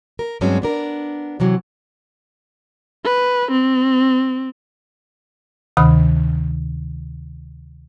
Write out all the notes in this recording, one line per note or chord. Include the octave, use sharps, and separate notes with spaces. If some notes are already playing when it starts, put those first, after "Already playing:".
A#4
G2 F#3 G#3 C4 C#4
B3 D4 A#4
C3 E3 F#3
B4
C4
D2 C3 D#3 B5 D#6